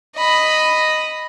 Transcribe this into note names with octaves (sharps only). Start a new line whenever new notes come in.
D#5 B5